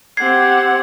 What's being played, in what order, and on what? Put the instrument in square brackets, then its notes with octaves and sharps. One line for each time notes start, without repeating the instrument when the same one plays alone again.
[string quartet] C4 G4 F#5 [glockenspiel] G#6 C7